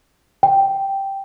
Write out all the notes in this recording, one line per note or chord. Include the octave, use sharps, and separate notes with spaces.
G5